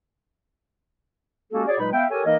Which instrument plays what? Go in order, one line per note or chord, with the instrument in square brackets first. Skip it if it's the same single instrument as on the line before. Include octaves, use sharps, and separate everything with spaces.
[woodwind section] G#3 A#3 C#4 F#4 G4 A4
F#4 G#4 C#5 D5
A#2 F#3 G#3 D#4 B4 B5
B3 E5 F5 G5
G4 A4 A#4 C#5 G#5
E3 A#3 D#4 A#4 D#5